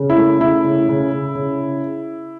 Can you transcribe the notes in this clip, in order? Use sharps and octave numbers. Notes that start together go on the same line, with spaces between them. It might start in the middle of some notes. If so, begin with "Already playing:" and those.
Already playing: C#3
E4
A3
C#3 E4
C#3
C#3
C#3
C#3